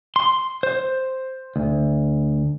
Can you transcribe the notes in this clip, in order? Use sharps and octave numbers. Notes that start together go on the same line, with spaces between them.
C6
C5
D2